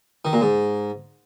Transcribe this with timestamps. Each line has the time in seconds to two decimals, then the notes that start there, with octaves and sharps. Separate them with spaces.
0.25 D#3
0.33 A#2
0.41 G#2